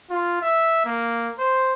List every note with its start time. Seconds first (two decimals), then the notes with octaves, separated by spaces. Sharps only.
0.10 F4
0.42 E5
0.85 A#3
1.39 C5